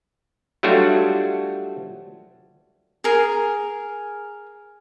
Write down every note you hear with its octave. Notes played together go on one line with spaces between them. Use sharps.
F#3 G3 A3 D4 F4 F#4
G#4 A#4